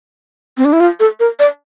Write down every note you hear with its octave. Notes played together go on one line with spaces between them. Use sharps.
C4
D4
E4
F4
A4
A#4
D5